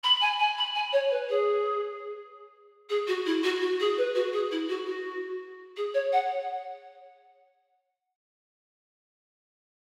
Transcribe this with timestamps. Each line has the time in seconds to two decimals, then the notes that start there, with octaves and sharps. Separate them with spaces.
0.03 B5
0.21 G#5
0.39 G#5
0.57 B5
0.75 G#5
0.92 C#5
1.10 B4
1.29 G#4
2.89 G#4
3.07 F#4
3.26 E4
3.43 F#4
3.61 F#4
3.79 G#4
3.97 B4
4.15 F#4
4.32 G#4
4.51 E4
4.68 F#4
4.86 F#4
5.76 G#4
5.94 C#5
6.12 F#5